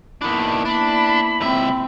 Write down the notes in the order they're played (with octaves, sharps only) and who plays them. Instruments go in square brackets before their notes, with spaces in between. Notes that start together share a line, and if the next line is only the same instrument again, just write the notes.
[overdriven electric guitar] D#3 D4 [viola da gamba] A#3 B3 E4 [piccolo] B5
[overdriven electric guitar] D4 [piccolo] B5
[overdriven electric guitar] C#2 E5 [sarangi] C4